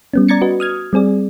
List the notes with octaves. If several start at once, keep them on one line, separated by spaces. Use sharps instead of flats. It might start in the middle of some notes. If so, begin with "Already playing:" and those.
G3 B3 C#4
D5 A#5 G#6 A6 C#7
F#4 B4 D#5
D#6 F6 G#6
G3 C4 G#4 D5